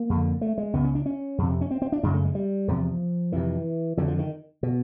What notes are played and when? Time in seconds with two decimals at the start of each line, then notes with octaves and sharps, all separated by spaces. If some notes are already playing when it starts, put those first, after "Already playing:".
Already playing: A#3
0.10 F2 D3
0.41 A3
0.58 G#3
0.73 C#2 C#3 B3
0.84 C#4
0.95 D4
1.06 C#4
1.38 F2 C3
1.61 C#4
1.71 C4
1.82 C4
1.92 D4
2.03 F#2 C#3 D4
2.13 A3
2.25 G#3
2.35 G3
2.68 E2 C3 F3
3.32 F2 C3 E3
3.97 F2 D3 F#3
4.08 F3
4.19 D#3
4.63 B2